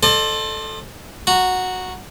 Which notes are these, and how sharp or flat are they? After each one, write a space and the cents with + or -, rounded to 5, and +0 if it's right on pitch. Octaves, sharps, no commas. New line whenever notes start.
A4 +0 C5 +25 D#5 -45
F#4 -5 A#5 +0